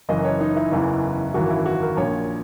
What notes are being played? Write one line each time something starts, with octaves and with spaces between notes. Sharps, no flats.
F#1 F#2 E3 D#5
C#5
D#4
E4
F#1 E2 C#3 E3 E4
G#1 F#2 E3 F#4
E4
F#4
A#4
A#1 A#2 C#5